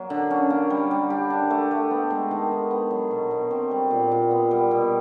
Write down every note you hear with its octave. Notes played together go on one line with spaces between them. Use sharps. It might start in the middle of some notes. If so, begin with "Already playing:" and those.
Already playing: F#3 A#3
D3
C#4
A#3
G3
G3
G4
D4
A3
A3
B3
G#3
D#3
D#3
B3
F#3
B2
B2
C4
G3
A#2
A#2
B3
G3
B2